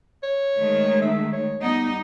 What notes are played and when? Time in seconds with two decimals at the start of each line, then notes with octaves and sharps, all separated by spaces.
0.23 C#5
0.56 D#3 G#3 A3
1.02 E5
1.33 C#5
1.62 G3 B3 D#4